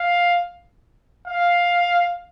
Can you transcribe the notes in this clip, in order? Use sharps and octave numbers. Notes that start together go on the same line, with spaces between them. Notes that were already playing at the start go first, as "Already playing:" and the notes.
Already playing: F5
F5